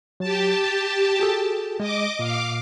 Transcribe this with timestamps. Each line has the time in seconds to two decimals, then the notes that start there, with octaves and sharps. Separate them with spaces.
0.20 F#3 G4 A5
0.64 A6
1.20 F#4 G#4 A4
1.80 G#3 D#5 D6
2.19 A#2 F5 D6